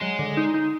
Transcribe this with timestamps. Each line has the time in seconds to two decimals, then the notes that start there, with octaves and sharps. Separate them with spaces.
0.01 F#3 G#3
0.19 D3
0.37 D#4
0.54 D#4